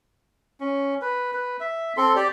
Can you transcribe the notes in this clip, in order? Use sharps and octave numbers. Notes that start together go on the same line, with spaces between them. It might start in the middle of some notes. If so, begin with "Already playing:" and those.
C#4
B4
B4
E5
C4 A4 C6
G4 D5